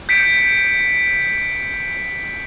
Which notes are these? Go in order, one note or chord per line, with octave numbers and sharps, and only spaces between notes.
G6 B6 C#7 D7